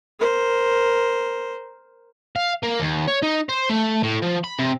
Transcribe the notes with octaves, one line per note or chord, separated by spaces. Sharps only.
A#4 C5
F5
A#3
D#2
C#5
D#4
C5
A3
A2
F3
B5
C3